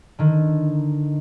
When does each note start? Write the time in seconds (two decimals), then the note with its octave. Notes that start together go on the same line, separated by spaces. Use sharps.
0.19 D3 D#3